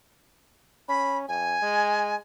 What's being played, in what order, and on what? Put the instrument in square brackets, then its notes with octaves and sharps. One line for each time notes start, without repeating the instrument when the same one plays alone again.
[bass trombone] C#4 [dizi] B5
[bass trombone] F2 [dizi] G#5
[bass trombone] G#3